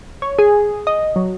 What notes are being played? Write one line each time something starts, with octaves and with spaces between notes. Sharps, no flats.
C#5
G#4
D#5
F#3